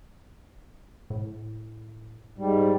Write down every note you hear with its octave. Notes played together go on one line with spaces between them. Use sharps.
A2
G#2 G3